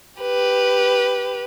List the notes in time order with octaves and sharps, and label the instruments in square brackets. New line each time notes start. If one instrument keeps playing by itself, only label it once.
[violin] G4 B4